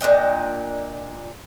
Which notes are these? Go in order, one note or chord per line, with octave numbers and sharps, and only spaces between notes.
A#2 D4 D#5 G5